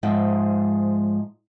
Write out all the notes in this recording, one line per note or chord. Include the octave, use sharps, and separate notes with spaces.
G#2 F3 G#3 C5 E5 G5